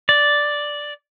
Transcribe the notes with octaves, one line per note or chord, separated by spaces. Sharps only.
D5